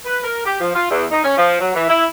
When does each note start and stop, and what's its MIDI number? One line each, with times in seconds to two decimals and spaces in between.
0.06 0.22 71
0.24 0.45 70
0.46 0.57 67
0.61 0.70 53
0.75 0.87 65
0.91 1.06 40
1.11 1.24 63
1.25 1.34 61
1.38 1.59 53
1.60 1.73 54
1.74 1.85 52
1.89 2.06 64